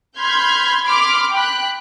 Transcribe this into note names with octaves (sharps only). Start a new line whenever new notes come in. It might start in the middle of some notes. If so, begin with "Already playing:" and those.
B5 C6 F6 G6 G#6
B5 C6 D6 F6
G5 B5 F#6